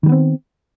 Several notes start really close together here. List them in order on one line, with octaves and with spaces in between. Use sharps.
D#3 G3 B3 C4